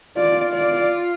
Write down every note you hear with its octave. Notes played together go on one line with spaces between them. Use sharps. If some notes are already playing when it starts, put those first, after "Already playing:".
F4 D5
D5